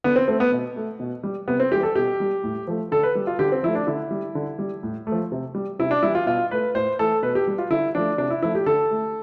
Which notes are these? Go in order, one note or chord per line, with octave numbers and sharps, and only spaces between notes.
D3 B3
C4
A3 C4
B3
B2
A3
B2
G3
C3 B3
C4
E3 G3 G4
A4
B2 G4
G3
A2
F3 A3
D3 A4
B4
G3
F4
D3 G4
C4
F3 A3 E4
D4
D3 E4
G3
D3
G3
A2
A3
F3
C3
G3
C3 E4
D4
E3 G3 E4
F4
B2 F4
A3 B4
A2 C5
E3 A3 A4
B2 B4
G4
G3
F4
D3 E4
F3 A3 D4
C3 D4
E4
F3 A3 E4
G4
D3 A4
A3